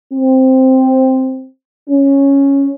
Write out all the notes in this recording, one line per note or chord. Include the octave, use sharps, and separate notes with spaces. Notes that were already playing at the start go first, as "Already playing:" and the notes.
C4
C#4